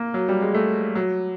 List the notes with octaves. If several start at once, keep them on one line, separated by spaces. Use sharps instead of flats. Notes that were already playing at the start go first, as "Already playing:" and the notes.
Already playing: A#3
F#3
G3
G#3
A3
F#3